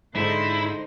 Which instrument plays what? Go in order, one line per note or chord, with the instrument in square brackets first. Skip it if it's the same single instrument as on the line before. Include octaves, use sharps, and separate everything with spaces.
[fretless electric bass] G#2 G#3 [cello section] D3 D#4 C5 [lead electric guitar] E4